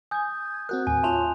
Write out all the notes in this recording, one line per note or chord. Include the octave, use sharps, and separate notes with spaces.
G#5 D#6 G6 G#6
C4 F#4 A#4 F#6
D#2 A2 G#5
F4 C#5 E5 A5 C6 F7